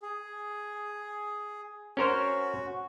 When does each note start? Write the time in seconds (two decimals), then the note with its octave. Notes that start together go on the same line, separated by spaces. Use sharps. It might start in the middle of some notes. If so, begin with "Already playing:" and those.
0.02 G#4
1.97 C#4 F#4 A#4 C5